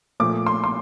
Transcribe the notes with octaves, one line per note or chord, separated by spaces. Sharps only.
A#2 F3 A3 D6
C6
C6